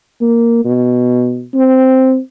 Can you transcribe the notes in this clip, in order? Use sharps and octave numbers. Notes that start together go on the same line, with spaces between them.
A#3
B2
C4